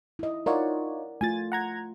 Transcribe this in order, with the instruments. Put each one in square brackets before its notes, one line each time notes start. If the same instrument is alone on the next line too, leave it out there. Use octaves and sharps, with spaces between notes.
[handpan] E4 D#5
[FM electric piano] D#4 F4 C#5 [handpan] A#4 D5 F#5
[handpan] A3 F4 [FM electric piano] G#5 A6
[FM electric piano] F#5 A#5 G#6